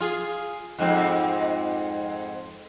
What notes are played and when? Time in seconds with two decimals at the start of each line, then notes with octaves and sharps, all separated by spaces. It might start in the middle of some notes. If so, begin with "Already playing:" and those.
0.01 F4 G#4
0.79 F2 G#2 C4